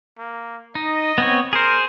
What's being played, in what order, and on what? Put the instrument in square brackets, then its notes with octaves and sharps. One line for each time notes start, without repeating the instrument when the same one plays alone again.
[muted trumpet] A#3
[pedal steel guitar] D#4 [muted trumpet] D#5
[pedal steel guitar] B3 C4 C#5
[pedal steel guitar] G#4 C5 [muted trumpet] A#4